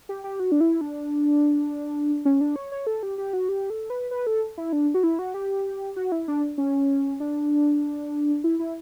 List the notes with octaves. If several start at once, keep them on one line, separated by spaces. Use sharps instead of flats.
G4
G4
F#4
D4
E4
D4
C#4
D4
C#5
C#5
A4
G4
G4
F#4
G4
A4
B4
B4
A4
E4
D4
F#4
E4
F#4
G4
F#4
E4
D4
C#4
D4
E4
E4